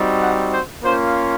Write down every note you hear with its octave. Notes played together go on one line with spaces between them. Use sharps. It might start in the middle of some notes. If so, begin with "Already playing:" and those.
Already playing: G3 C4 D#4 F#4
F#5
C5
A#3 C#4 F4 C5